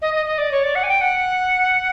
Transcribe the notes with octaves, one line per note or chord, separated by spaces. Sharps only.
D#5
D#5
D#5
D5
C#5
D5
F#5
G#5
G5
F#5